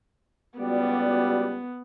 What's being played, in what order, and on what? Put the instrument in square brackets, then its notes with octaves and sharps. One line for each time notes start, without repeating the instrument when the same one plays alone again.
[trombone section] C#2 G3 [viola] B3 [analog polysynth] F#4 D5